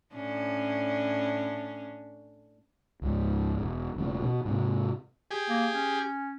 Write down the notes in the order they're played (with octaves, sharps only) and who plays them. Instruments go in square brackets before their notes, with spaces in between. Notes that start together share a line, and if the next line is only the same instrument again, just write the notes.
[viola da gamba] A2 C#4 D4
[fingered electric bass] C#2 G#2
E1
E1 C#3 A3
B2
G#2 C3
[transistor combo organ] G4 G#4
[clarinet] A#3
C#4